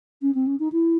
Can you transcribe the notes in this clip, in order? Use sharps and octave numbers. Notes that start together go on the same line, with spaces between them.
C#4
C4
C#4
D#4
E4